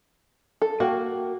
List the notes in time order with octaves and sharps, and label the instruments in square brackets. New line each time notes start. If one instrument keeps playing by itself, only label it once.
[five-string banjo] A4
[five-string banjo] A#3 G5 [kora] F#4